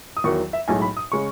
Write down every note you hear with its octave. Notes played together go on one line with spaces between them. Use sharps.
D#6
E2 D#3 F#3 C#6
E5
B1 A2 G#3 G#5
B5
D#6
C#3 G#3 C#6